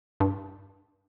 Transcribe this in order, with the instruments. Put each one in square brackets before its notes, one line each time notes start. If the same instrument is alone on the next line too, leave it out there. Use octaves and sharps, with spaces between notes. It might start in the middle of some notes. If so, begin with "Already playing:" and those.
[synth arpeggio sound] G2